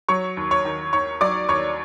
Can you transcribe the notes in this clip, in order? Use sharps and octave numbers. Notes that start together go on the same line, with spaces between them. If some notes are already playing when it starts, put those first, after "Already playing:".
F#3 C#5 C#6
D#2
C#5 C#6
D#3
D#2 C#5 C#6
F#3 D5 D6
D#2 C#5 C#6